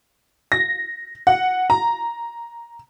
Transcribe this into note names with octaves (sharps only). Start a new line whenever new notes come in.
A#6
F#5
A#5